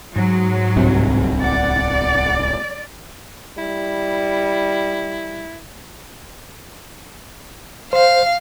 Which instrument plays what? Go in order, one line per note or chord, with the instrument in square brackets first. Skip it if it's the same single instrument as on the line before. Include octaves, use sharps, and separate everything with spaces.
[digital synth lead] G#2 [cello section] F#3
[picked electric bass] D1 C2 C3
[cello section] D5 [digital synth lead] F#5
[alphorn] G3 [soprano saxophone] E4
[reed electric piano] C5 [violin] F5